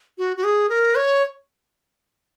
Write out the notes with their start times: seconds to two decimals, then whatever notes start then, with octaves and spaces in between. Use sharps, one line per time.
0.18 F#4
0.37 F#4
0.44 G#4
0.69 A#4
0.95 C#5